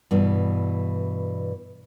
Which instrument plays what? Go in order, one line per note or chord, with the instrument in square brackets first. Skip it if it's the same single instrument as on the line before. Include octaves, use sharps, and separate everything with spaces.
[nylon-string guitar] G2 B2 E3